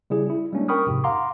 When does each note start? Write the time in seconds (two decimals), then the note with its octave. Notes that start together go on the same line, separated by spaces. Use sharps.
0.10 C#3 G3 E4 G#4
0.30 E4
0.52 G3 G#3 A#3 C#4 D4
0.68 A#4 G5 B5 C#6 D#6 F6
0.86 F2 G#2 C3
1.04 F5 F#5 A#5 C6 D6